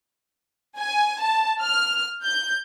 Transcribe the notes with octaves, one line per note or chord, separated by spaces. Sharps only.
G#5
A5
F6
G6